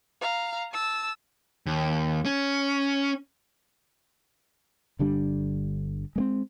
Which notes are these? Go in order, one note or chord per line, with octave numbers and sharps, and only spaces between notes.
F5 A#5
A5 E6
D#2
C#4
G1 D3 G3 D4
G#3 A#3 C4